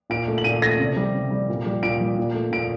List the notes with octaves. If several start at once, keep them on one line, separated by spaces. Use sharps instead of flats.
A#2 D7
A3
F#7
A#2 D#7
A3 A#6
C3
G3
C3
G3
A#2
G3
A#2 D7
G3
A#2
A3
A#2 D7